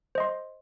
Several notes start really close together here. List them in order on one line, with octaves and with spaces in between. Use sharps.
C5 D#5 C6